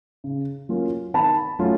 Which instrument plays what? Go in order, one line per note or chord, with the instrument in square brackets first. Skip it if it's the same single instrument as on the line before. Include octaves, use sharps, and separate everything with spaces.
[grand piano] C#3
F#3 A#3 C#4 F4
[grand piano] D#3 [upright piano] A5 B5
[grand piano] F#3 A3 C#4 F4